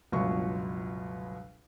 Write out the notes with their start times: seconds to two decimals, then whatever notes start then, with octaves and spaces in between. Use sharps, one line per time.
0.12 G1 C#2 B2 F#3 C#6